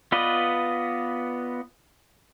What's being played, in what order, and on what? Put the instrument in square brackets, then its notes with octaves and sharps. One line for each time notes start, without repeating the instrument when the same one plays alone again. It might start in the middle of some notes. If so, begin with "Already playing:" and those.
[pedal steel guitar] B3 F4 B4 D5 D#5